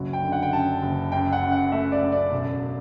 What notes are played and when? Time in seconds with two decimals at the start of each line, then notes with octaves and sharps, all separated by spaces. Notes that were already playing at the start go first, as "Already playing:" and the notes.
Already playing: F#1 F#3
0.13 G5
0.22 D3
0.32 F#5
0.42 G5
0.53 F#2 A5
0.82 F#1
1.12 F#2 G5
1.33 F#5
1.42 F#2
1.52 F#5
1.72 A3 E5
1.92 D5
2.02 F#2
2.12 D5
2.32 E1